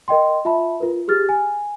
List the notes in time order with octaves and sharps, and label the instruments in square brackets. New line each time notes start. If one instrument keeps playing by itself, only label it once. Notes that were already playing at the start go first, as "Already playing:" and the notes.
[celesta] A#4 D#5 G5 C6
F4 E5 A5 B5
F4 A#4 B4
G4 G#4 F6 A6
G#5